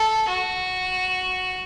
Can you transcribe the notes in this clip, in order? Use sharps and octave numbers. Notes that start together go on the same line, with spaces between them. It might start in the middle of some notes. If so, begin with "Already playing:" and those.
Already playing: A4
F#4